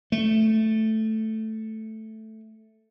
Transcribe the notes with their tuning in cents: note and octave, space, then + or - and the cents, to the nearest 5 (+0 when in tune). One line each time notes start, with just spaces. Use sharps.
A3 +0